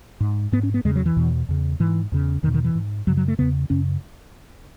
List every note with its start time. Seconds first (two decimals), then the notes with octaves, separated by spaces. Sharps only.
0.20 G#2
0.52 G#2 B3
0.63 C#4
0.74 B3
0.85 E2 C#3 G#3
0.96 F#3
1.06 E3
1.16 E2 B2
1.49 E2 C#3
1.80 G#2 E3
2.12 E2 C#3
2.43 E2 D#3
2.47 B2
2.54 D#3
2.64 E3
2.75 G#2
3.07 F#2 C#3 F#3
3.17 F#3
3.28 A3
3.38 E2 C#3 B3
3.70 F#2 C#3 C#4